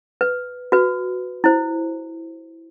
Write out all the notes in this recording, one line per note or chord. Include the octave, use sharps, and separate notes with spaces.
B4
F#4 B4
E4 C5